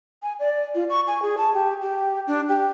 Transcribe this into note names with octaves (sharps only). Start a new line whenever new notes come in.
G#5
D5
F4
C#6
G#5
G#4
A5
G4
G4
D4
G4